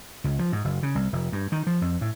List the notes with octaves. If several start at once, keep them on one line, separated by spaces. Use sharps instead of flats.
C#2
F3
G#2
F#1
C#3
C2
F1
G2
D#3
F3
F2
A2